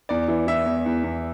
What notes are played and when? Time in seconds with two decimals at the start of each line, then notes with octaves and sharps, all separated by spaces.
0.09 E2 D5
0.28 E3
0.47 E3 E5
0.66 E2
0.86 E2
1.04 E2